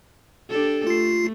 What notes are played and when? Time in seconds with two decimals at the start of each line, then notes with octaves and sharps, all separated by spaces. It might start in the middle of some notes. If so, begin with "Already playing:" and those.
0.50 D4 G4 A4
0.87 A3 F4 C7